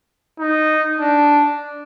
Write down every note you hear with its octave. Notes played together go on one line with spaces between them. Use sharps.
D#4
D4